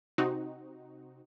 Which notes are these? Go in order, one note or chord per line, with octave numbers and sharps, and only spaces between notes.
C3 C4 D#4 F#4